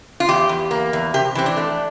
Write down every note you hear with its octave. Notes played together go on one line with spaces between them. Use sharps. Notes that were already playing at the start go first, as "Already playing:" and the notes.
F4
E2 G4
E2
A#3
E2
C3 G4
E3 C4
D4
A3